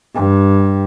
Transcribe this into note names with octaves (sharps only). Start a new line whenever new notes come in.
G2